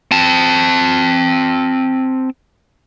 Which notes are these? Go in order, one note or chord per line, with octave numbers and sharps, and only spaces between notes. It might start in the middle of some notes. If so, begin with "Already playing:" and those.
C4 A5